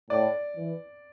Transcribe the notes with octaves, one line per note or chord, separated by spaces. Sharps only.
A2 D5
E3